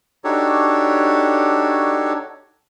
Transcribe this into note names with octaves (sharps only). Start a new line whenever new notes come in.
D4 D#4 F#4 G4 A4 C#5